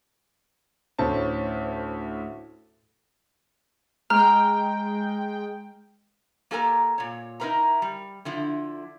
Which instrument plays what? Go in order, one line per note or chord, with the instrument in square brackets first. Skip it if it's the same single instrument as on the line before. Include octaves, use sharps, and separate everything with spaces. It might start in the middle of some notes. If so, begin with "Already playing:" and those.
[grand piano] D2 A2 C#4 C5 A5
[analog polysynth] G#3 G5 [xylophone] A#5 [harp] F6
[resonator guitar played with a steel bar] A#3 G4 A4 A#4 G#5 A#5
A#2 C#5
D#4 E4 A#4 B4 F5 A#5
G3
D3 F3 E4